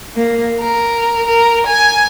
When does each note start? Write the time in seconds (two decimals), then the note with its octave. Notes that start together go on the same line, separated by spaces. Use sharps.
0.15 A#3
0.59 A#4
1.27 A#4
1.66 G#5